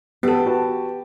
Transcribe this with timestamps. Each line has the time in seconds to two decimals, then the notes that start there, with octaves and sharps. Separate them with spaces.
0.23 B3 G4 A4
0.46 F#4 B4 A5